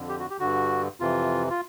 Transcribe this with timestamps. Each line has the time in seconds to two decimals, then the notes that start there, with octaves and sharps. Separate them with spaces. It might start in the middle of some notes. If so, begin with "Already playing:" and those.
Already playing: F2 D3
0.09 G4
0.19 F#4
0.30 G4
0.40 G2 D3 F#4
1.00 F2 C3 E3 F4
1.50 F4